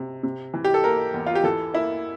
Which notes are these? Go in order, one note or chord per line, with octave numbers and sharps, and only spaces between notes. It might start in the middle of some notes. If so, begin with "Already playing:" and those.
Already playing: C3
C3
E3
G4
A4
A#3 A#4
E2
F4
G4
E3 A4
A#3 E4